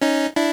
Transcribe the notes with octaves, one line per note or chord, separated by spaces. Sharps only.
C#4 D#4
D4 E4